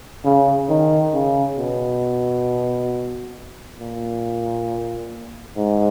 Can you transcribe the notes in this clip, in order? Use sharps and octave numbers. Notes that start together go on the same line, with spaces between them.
C#3
D#3
C#3
B2
A#2
G#2